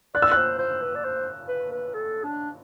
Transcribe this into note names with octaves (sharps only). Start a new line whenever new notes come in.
D5 F#6
E6
C5 F#6
C5
B4
D5
C5
B4
B4
A4
D4